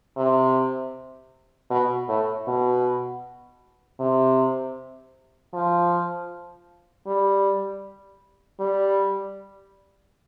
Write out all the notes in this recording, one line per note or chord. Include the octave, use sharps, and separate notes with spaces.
C3
B2
A2
B2
C3
F3
G3
G3